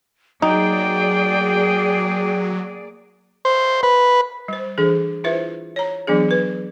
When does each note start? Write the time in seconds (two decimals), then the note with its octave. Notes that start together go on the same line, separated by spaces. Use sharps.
0.42 F#3 A#3 D#4 G#4 D5 G5
3.45 C5
3.83 B4
4.48 G3 C5
4.78 E3 D4 G#4 A4
5.24 E4 F4 B4 C5 E5
5.76 C#5 A#5
6.07 E3 F#3 B3 D4 G#4
6.31 B4